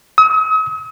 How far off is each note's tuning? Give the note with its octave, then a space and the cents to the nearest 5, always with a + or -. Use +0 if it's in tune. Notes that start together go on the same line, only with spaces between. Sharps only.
D#6 +45